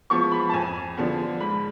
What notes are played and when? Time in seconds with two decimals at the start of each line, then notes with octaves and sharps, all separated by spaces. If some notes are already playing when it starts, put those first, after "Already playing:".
0.10 F3 G#3 B3 C#6
0.32 B5
0.49 A5
0.53 F2 G#5
0.97 D3 F3 B3
1.40 G#2 B5